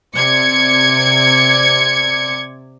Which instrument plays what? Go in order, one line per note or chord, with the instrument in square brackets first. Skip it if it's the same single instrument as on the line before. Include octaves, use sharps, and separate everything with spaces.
[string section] C3 D5 G#6 C#7